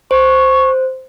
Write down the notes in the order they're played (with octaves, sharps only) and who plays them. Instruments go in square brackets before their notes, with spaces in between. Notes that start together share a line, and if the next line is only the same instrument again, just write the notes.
[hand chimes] C5 [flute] C#6